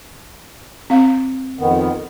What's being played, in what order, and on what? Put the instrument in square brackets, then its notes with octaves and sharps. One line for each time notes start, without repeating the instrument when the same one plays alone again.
[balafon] C4 F5
[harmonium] F2 D#3 B3